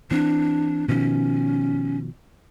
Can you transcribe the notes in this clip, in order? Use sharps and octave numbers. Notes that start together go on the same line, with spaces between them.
E3 C4 D4
B2 D#3 F3 C#4